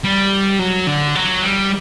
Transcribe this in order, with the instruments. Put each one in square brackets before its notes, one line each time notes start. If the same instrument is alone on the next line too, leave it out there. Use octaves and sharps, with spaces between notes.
[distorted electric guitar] G3
F#3
D3
F#3
G3